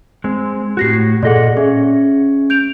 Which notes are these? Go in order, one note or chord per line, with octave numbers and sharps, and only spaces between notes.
G#3 C4
A2 F#4 G4 A#6 C7
A#2 G#4 A4 D5 D#5 F#5
C#4 G#4 E5
G6 D7 F7